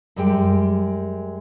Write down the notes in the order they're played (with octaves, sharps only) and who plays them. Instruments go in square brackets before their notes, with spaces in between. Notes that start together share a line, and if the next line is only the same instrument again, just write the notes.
[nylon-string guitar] F#2 G3 G#3 G5